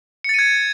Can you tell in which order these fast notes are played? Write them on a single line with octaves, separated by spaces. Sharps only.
C#7 A6 D#7 G#6